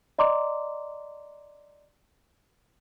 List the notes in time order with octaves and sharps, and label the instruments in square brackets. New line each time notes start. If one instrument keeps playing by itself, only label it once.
[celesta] D5 D#5 A#5 C6 D6